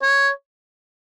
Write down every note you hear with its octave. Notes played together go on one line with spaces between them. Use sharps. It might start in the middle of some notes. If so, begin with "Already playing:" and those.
C#5